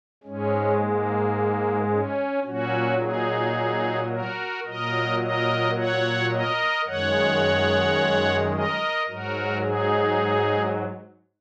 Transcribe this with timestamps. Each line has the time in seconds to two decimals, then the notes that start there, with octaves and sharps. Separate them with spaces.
0.23 G#2 G#3 C#4
0.79 A#3
1.90 C#4
2.45 A#2 F#3 C#4 F#4
3.00 D#4 G#4
4.10 F#4 A#4
4.66 A#2 F#3 A#4 D#5
5.21 A#4 D#5
5.76 C#5 F#5
6.32 A#4 D#5
6.87 F#2 D#3 G#3 C#5 F#5
8.53 A#4 D#5
9.08 G#2 F#3 F#4 A#4
9.63 D#4 G#4